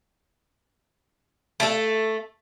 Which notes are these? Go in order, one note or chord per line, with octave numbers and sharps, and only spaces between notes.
A3 A4